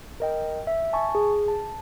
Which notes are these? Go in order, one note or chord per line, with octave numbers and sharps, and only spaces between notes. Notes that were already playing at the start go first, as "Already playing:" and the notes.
A#4 D#5 G5
E5
G#5 A5 C#6
G#4
A5